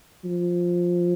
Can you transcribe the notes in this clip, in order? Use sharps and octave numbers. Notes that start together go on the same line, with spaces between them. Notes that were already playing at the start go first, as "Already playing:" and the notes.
F3